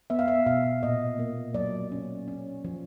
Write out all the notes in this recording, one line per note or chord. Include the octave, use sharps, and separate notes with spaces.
B3 E5
F5
E5
B2 F5
A#2 D#5
A#3
F#3 D5
C#4
C#4
F3